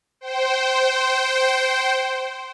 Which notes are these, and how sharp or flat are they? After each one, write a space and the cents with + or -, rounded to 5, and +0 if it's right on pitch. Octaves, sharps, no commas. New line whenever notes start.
C5 +0 G5 -30